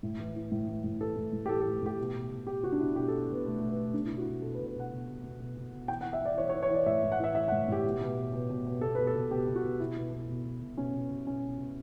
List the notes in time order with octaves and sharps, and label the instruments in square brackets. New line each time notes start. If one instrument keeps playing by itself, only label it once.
[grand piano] A2
E3
E3
A2
E3
A2
E3 A4
A2
A2
G4
E3 A4
A4
A2
A2 G4
B2
B2
B2
B2 G4
B2 F#4
D4
B2 E4
B2 G4
A4
B2
B2 B3
B2 A3
B2 A3
B3
B2
B2 D4
E4
B2
F#4
B2
B2 A4
B4
B2
B4
B2 F#5
B2
B2
B2
B2
B2
B2
E3 G5
F#5
E3
E5
E3 D5
E3 C#5
C#5
E3
C#5
E3 D5
A2 E5
A2
F#5
E3 E5
E3 E5
F#5
A2
A2 G4
B2
B2
B2
B2
B2
B2
B2 A4
B2 B4
A4
B2
B2 G4
B2
F#4
B2
B2 E4
B2
B2
B2
B2
B2
B2 C#4
B2
B2
B2 C#4
B2
B2